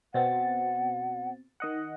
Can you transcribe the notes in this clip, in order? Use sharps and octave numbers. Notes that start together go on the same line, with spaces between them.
B2 C4 F#5 A6
D#3 D#5 F#5